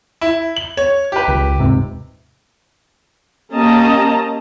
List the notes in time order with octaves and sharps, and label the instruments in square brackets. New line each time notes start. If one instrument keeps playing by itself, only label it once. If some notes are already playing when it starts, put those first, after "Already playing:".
[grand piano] E4
F#7
C#5
G4 B4
[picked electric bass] C#2
D#1 G#2 C3
[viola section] A#3 C#4 G4 D#5 A5 A#5